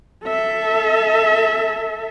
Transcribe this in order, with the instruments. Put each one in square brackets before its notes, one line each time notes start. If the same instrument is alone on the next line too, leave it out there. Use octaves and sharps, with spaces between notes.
[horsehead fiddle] A4 E5